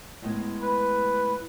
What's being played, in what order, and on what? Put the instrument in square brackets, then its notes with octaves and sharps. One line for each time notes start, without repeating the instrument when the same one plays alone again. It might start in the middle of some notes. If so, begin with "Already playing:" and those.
[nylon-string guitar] A2 G#3 B3
[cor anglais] B4